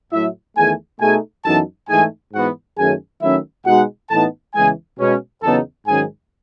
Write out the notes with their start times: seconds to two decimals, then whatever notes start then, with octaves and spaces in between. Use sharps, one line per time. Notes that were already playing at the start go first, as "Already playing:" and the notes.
0.12 A2 F#3 A3 E4 E5
0.57 E2 D#3 A3 G#4 G#5
1.01 B2 A3 D#4 G#4 G#5
1.45 F#2 E3 B3 D#4 A4 A5
1.89 G#2 E3 A3 D#4 G#4 G#5
2.33 G#2 E3 B3 F#4 F#5
2.77 F#2 D#3 A3 C#4 G#4 G#5
3.22 D#3 F#3 A3 C#4 E4 E5
3.66 B2 G#3 D#4 F#4 F#5
4.10 A2 E3 B3 D#4 A4 A5
4.54 E2 C#3 E3 G#3 G#4 G#5
4.98 B2 G#3 C#4
5.43 E2 C#3 F#3 B3 D#4 A4 A5
5.87 G#2 D#3 F#3 C#4 G#4 G#5